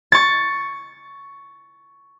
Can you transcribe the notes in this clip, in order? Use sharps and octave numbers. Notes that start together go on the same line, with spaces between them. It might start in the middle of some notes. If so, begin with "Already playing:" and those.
C#6 A6